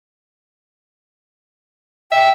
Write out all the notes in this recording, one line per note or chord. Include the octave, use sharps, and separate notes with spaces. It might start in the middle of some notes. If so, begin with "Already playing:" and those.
E5 G5